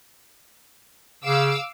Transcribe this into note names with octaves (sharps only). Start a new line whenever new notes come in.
C#3 F5 D6 E6